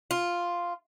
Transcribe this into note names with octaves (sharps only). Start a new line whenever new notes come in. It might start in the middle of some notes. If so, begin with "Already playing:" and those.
F4